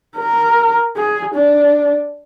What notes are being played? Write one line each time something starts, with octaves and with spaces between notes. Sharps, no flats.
A#4
G#4
D4